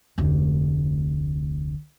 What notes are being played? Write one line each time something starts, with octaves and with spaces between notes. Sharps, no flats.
F1 D2